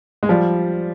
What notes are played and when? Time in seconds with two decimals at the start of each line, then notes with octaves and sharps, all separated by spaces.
0.23 G#3
0.29 F3 G3